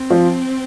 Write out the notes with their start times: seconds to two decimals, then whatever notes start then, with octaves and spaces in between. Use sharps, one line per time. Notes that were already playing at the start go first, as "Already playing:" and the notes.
Already playing: C4
0.10 F3